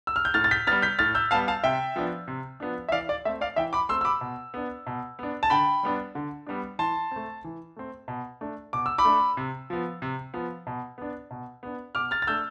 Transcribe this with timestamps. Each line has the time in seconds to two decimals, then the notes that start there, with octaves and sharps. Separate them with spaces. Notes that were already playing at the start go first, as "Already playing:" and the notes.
0.07 E6
0.16 F6
0.25 G6
0.34 A2 F6 A6
0.44 A6
0.51 G6 B6
0.67 B3 F6 A6
0.72 G3
0.82 G6 B6
0.99 A2 F6 A6
1.15 E6 G6
1.31 G3 B3 F5 A5
1.48 F5 A5
1.64 C3 E5 G5
1.96 F3 B3 D4
2.28 C3
2.60 F3 B3 D4
2.89 E5
2.92 E3 D5 F5
3.09 D5
3.25 A3 E5
3.29 C4
3.41 D5 F5
3.56 E3 E5 G5
3.73 B5 D6
3.89 A3 C4 C6 E6
4.01 E6
4.05 B5 D6
4.21 B2
4.54 B3 D4
4.87 B2
5.19 B3 D4
5.43 A5
5.50 D3 G5 B5
5.83 G3 B3 D4
6.15 D3
6.47 G3 B3 D4
6.79 E3 A5 C6
7.11 A3 C4
7.44 E3
7.76 A3 C4
8.08 B2
8.41 A3 D4
8.73 B2 D6
8.86 E6
8.98 B5 D6
9.05 A3 D4
9.37 C3
9.70 F3 B3
10.02 C3
10.34 F3 B3
10.67 B2
10.98 B3 D4
11.31 B2
11.63 B3 D4
11.95 B2 D6 F6
12.11 F6 A6
12.22 A6
12.27 A3 D4 E6 G6